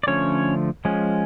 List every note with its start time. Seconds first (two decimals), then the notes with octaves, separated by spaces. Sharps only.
0.03 D5
0.07 D3 F3 A3 C#4 C#5
0.85 F3 G#3 C#4